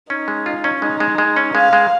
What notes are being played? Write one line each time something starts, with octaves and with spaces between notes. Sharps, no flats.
C#4 D#4
G#3
F4
C#4
G#3 D#4
G#3
G#3
C#4
G#3 F5
G#3